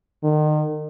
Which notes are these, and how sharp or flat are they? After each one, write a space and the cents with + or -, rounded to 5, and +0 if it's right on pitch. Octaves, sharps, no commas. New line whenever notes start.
D#3 -35